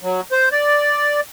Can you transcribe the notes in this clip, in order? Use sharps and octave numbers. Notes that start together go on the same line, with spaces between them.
F#3
C5
D5